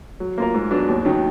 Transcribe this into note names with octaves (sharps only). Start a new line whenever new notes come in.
F#3
A#3 F4 A#4
G#2
F#3 B3 D4
D#2
D#3 F#3